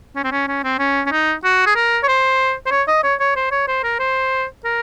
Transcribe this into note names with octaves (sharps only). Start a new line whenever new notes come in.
C#4
C4
C#4
C#4
C4
C#4
C#4
D#4
F#4
G#4
A#4
C#5
C5
C5
C#5
D#5
C#5
C#5
C5
C#5
C5
A#4
C5
A#4